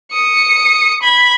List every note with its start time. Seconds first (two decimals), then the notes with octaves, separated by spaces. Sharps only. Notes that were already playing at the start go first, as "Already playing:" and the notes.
0.12 D#6 C#7
1.02 B5 G#6